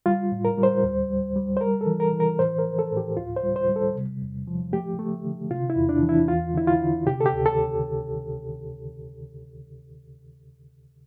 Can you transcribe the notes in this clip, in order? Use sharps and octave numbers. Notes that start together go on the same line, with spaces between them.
G3 F4
A2
A#4
G3
C5
D2
G3
G3
C5
G3 A#4
A4
E3
A#4
E3
A#4
A2 C5
A#4
F3
A4
A2
G4
D2 F4
C5
G3
C5
G3
A4
C3
E2
F3
A3 G4
A3
D3
C3 F4
E4
E2
D4
E3
E4
E2 F4
D3 E4
F4
D3
C3 G4
A4
G4
D2
A4